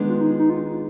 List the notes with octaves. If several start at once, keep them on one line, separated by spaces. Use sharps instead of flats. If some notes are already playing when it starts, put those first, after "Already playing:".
Already playing: D#3 G#3 B3 D4
F4
D#4
D#4
F4